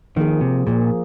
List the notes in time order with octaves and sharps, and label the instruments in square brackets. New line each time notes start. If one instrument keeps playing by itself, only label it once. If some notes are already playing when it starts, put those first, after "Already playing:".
[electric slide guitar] D#3 [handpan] F3 A#3 G#4
[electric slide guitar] C3
[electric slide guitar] A#2 [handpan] F3 A#3 G#4